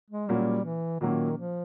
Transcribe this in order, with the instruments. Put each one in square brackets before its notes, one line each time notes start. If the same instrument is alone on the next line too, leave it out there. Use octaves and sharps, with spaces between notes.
[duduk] G#3
[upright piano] A#2 F#3 A#3 C#4 [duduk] G3
[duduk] E3
[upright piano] A#2 F#3 A#3 C#4 [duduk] D#3
[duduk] F3